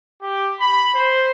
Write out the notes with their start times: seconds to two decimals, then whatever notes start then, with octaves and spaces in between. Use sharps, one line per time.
0.22 G4
0.60 B5
0.95 C5